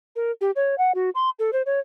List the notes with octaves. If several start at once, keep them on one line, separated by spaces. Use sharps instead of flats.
A#4
G4
C#5
F#5
F#4
C6
A4
C5
C#5